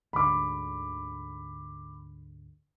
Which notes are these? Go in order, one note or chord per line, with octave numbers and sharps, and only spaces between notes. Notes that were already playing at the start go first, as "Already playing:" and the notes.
D2 G#2 D3 B5 D6